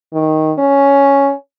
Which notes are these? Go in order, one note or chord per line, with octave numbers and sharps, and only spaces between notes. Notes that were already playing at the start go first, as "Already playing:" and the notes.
D#3
C#4